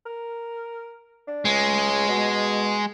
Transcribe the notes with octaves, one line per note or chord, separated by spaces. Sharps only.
A#4
D4
C#2 G#3
B2